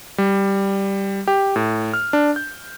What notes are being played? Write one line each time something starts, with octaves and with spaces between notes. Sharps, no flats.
G3
G4
A2
F6
D4
G6